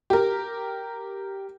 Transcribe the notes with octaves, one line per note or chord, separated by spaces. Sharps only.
G4 A#4